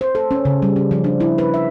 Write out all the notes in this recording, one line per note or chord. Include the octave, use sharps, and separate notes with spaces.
C5
A4
C#4
C#3
G3
C#4
F3
D4
E4
B4
E5